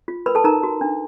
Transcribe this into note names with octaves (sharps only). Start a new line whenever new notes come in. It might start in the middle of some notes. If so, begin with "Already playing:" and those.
F4
A#4 B4 B5
A4 A5
D#4 A#4 A#5
F#4
D4